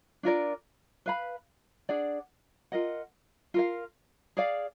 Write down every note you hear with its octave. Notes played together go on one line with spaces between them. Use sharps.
D4 F4 A#4 D5
B4 F5 B5
D4 G#4 D5 F#5
F4 A#4 D#5 F#5
F4 A#4 F5
G#4 D5 F5